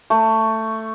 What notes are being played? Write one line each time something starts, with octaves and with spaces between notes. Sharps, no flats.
A3